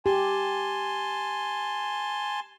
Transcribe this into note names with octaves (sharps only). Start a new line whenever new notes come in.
G4 G#5 A5 C6